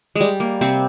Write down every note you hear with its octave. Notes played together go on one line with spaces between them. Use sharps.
G#3
G3
A#3
C3 C4